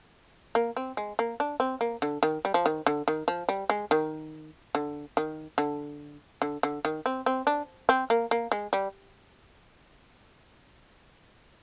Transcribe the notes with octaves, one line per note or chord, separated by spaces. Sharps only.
A#3
C4
G#3
A#3
D4
C4
A#3
D3
D#3
G3
F3
D#3
D3
D#3
F3
G3
G#3
D#3
D3
D#3
D3
D3
D3
D#3
C4
C4
D4
C4
A#3
A#3
G#3
G3